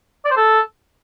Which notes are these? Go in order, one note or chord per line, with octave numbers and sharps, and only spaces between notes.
D5
C5
A4